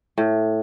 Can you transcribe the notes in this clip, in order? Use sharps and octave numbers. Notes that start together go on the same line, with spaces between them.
A2